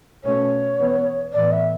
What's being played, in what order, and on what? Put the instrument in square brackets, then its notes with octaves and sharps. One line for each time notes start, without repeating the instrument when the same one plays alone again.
[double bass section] B2 A3 C#4 [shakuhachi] C#5
[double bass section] E3 B3
[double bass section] A2 E3 B3 [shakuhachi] D5
[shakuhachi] E5